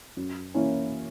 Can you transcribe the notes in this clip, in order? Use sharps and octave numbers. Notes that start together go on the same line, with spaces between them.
F#2
E3 A#3 C#4 E4